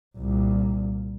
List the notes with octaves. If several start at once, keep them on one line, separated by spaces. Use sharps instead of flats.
C2 A#2